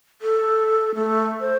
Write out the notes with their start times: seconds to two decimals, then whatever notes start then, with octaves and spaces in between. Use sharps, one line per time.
0.22 A4
0.95 A3
1.41 C5